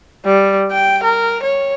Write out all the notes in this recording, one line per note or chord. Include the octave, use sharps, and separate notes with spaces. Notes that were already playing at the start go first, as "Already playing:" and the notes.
G3
G5
A#4
C#5